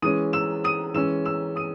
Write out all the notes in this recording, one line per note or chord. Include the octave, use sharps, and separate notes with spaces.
E3 G#3 C#4 D#6 D#7
E6 E7
D#6 D#7
E3 G#3 C#4 E6 E7
E6 E7
D#6 D#7